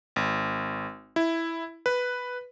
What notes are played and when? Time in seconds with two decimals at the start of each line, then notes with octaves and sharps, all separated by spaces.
0.16 G#1
1.16 E4
1.86 B4